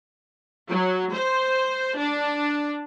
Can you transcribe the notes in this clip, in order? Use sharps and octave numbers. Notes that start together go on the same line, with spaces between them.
F#3
C5
D4